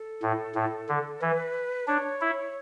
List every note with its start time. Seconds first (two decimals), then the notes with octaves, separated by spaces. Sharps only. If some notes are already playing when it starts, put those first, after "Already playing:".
Already playing: A4
0.22 A2
0.55 A2
0.89 D3
1.21 E3 B4
1.88 D4 C#5
2.21 E4